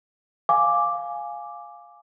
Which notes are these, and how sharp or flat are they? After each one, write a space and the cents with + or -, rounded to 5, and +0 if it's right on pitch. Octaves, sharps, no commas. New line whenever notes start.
F5 +0 G#5 +0 D6 +0